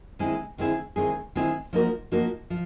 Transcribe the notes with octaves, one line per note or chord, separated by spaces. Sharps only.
D#3 G#3 C4 E4 G#4
D#3 G#3 C4 E4 G#4
D#3 G#3 C4 E4 G#4
D#3 G#3 C4 E4 G#4
F3 A#3 D#4 F#4 A#4
F3 A#3 D#4 F#4 A#4
F3